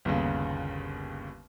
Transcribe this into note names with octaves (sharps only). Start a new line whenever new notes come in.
G1 D#2 C#3